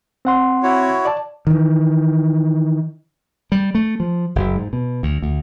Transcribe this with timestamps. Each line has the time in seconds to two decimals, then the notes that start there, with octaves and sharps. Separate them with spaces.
0.25 C4 F#5 C6
0.63 E4 F#4 C#5
1.05 D5 A5
1.47 D#3 E3
3.52 G3
3.75 A3
4.00 F3
4.35 F#1
4.56 G#2
4.73 B2
5.03 D2
5.22 D2